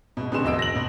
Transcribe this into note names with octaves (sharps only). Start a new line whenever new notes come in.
B2 G#3
B2 D3 C4 G#4 C6 E7
E1 D#5 E6 D7
A#6 F#7
B2